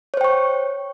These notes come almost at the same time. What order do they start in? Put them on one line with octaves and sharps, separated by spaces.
C#5 C5 G5 C#6